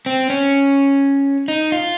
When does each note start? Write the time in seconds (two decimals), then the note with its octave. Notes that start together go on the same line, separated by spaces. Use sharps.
0.06 C4
0.30 C#4
1.48 D#4
1.72 F4